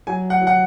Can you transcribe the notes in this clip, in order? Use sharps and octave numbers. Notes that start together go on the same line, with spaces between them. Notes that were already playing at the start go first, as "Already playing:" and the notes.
F#3 G#5
F#5
F#3
F#5